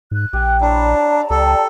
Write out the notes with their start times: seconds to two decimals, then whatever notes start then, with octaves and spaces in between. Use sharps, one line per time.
0.11 G#2 F#6
0.33 A#1 G4 G#5
0.61 D4 E4 C#5 D5 A5 A#5
1.30 C#2 G4 A4